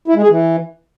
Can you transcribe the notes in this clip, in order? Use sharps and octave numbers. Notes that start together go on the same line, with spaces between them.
E4
G#3
G#4
E3